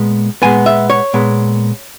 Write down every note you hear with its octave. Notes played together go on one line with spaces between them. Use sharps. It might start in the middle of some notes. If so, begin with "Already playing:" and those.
Already playing: A#2 G#3 B3
A#2 G#3 B3 G#5
E5
C#5
A#2 G#3 B3